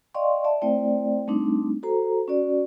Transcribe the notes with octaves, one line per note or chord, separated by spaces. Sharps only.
D5 D#5 F5 G5 C6 C#6
D5 E5 A5
A3 C4 E4 C5 D5 G5
G3 A3 C4 D4 D#4
F#4 A4 C5 A#5
C#4 F#4 D5